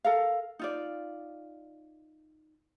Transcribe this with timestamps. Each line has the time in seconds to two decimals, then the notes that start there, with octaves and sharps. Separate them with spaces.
0.05 A4 A#4 F5
0.59 D#4 F4 D5